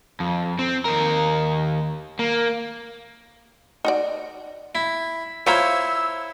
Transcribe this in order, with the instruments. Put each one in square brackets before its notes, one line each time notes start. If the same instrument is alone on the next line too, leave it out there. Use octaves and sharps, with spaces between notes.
[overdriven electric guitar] F2
C4
D#2 A#4
A#3
[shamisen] D#4 F#4 D5
[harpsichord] E4
[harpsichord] E4 C5 C#5 [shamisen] F4 F5 A#5 [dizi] E6